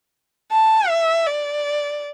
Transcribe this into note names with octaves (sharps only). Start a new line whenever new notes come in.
A5
E5
D5